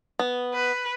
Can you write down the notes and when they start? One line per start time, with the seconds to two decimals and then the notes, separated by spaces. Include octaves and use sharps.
0.19 B3
0.54 B4